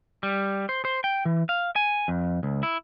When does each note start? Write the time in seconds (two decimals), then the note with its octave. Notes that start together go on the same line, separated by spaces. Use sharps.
0.23 G3
0.69 C5
0.85 C5
1.04 G5
1.25 E3
1.49 F5
1.76 G#5
2.08 F2
2.43 C#2
2.63 E4